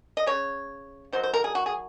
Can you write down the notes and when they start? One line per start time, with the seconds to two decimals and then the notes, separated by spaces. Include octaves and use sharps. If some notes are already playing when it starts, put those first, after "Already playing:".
0.17 D#5
0.26 C#3 G#3 C#5
1.12 D#3 F#3 C5
1.23 C5
1.34 A#4
1.44 G#4
1.55 F#4
1.66 G#4